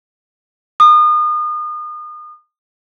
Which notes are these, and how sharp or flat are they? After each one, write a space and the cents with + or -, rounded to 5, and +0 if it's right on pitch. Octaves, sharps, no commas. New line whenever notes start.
D#6 -35